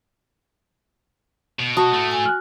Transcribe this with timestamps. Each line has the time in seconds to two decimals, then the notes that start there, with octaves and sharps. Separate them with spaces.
1.59 B2
1.77 F#4 A5 D#6
1.93 A3 E4
2.11 G#5
2.25 F6 F#6